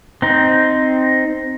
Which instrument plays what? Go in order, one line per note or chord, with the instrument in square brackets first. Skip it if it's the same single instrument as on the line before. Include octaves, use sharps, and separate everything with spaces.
[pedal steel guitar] C4 D#4